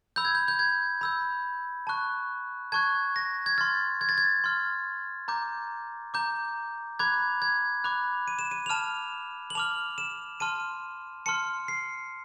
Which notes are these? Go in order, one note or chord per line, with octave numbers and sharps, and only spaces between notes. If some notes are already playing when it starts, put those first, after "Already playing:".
B5 E6 G6
G#6
G6
G6
G#6
B5 E6 G6
A5 C#6 F#6
A5 C#6 F#6 G#6
A#6
G#6
C6 F6 A6
G#6
A6
G#6
C6 F6
A#5 D6 G6
A#5 D6 G6
B5 D6 F#6 G#6
G#6
B5 D6 F#6
D#7
E7
D#7
F7
A5 D6 F6 E7
F#7
A5 D6 F6 F7
E7
A5 C6 F6 D#7
A5 C6 F6 C#7
C7